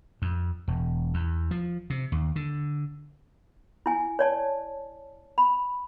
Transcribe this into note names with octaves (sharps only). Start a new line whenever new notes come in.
F2
E1
E2
F3
C3
D#2
D3
E4 G#5
C#5 D5 A5
B5